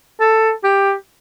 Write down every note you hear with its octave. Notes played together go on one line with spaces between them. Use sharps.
A4
G4